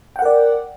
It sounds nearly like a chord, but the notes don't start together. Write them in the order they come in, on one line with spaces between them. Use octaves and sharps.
G5 F#5 A#4 D5